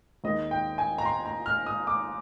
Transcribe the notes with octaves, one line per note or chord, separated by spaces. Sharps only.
D#2 D#3 G#3 D#5
G5
G#5
A#5
C6
A#5
F6
D#6
D6